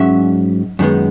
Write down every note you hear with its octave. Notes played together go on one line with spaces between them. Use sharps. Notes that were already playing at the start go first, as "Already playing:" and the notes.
Already playing: G#2 F#3 C#4 E5
F#2 D#3 G#3 B3